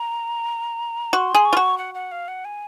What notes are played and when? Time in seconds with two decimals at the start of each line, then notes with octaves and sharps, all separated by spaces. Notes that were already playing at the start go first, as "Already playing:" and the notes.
Already playing: A#5
1.13 F#4 C6
1.35 G#4
1.45 C#6
1.53 F4
1.57 F#4
1.78 F#5
1.94 F#5
2.12 F5
2.28 F#5
2.45 G#5